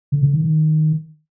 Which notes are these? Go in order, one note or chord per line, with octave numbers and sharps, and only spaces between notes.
D3
D3
D#3
D#3